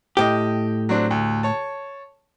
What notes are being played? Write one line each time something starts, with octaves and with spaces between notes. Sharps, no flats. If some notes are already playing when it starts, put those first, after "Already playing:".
A2 G4 D#5 G5
F#3 C4 D4
D2
C#5 A5